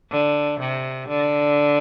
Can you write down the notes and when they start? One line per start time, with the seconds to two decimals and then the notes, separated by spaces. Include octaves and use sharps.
0.11 D3
0.60 C3
1.09 D3